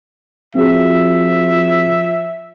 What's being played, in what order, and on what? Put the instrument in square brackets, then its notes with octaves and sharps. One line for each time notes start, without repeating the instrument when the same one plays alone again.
[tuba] F3 [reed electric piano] C4 F#4 G#4 [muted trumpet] E5